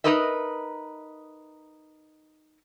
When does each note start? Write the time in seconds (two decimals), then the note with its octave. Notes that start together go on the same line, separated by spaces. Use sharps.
0.04 D#4 G4 A#4 B4 D#5 E5